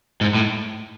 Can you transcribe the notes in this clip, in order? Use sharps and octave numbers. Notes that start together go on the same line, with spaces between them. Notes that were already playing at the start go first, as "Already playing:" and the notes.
G#2
A2